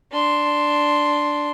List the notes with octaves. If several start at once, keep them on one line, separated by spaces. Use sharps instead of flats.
D4 C6